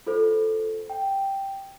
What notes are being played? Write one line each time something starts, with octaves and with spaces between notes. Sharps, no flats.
F4 A4 C5
G5